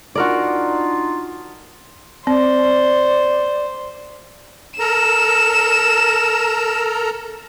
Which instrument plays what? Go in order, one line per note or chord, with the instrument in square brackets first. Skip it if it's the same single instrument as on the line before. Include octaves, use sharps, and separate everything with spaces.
[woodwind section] D4 D#4 F4 [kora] F#4 A#4 D5
[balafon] C4 [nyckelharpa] C5 [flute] D5
[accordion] A4 A#4 A#5 [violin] E7